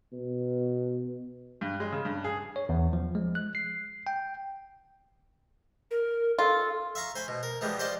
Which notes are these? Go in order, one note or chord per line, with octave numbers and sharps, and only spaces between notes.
B2
G2
G#3
C#3
G2
G#4
C#5
E2
F3
G#3
F#6
C7
G5
A#4
F4 A4
E5 F5 A#5 C#6
C5 G#5 B5
B2
A#4
E3 F3 G3 G#3 B3
C5 D5 D#5 F5 A5